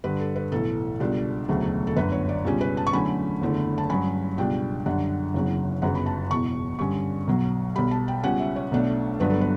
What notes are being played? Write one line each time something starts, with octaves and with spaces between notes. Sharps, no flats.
G2 D3 G3 B4
A4
B4
B1 A2 E3 A4
C#2 B2 G3 D4
E1 D2 C#3 F#3 A3
A4
G1 F#2 D3 B4
C#5
D5
C#2 B2 G3 C#4
B4
A5
C#6
E2 D3 F#3 A3 C#4 B5
F#1 E2 D3 A3
A5
G2 F#3 C#4 B5
C#2 B2 G3 D4 G5
F#2 D3 G3 D4 F#5
F#1 E2 C#3 F#3
G1 F#2 C#3 F#3 B3 F#5
B5
A5
E1 E2 B2 C#6
G2 D3 G3 C#4 C#6
B1 B2 F#3
B1 B2 G3 B5
A5
G5
C#2 B2 G3 C#4 F#5
E5
C#5
B1 B2 A3 D4
G1 G2 F#3 B3 D4 B4
A4
B4